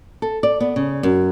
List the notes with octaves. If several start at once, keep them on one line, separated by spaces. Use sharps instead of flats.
A4
D5
B3
C#3
F#2